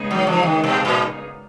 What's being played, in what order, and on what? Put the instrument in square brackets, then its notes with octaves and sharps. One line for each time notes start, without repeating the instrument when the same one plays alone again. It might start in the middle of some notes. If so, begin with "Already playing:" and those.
Already playing: [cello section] C#3 G#3 B3 D#4 G#4
[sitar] F#3
F3
D#3
B2
A#2